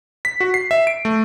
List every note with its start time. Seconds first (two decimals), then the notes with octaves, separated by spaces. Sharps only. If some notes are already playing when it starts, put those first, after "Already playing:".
0.25 B6
0.40 F#4
0.54 C7
0.71 E5
0.87 D7
1.05 A3